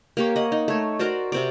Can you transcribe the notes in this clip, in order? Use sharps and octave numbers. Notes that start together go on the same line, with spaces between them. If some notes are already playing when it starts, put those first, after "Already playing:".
A#3 G4 C#5
D#5 F#5
D#4
A3 C#5
F#4 A#4 C5 D5
C3 C4 D5